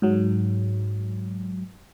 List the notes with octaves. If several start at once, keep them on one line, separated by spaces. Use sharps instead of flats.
G#2 F#3